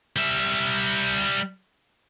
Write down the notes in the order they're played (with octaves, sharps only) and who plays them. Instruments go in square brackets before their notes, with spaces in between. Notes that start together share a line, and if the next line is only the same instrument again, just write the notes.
[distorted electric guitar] G3 E5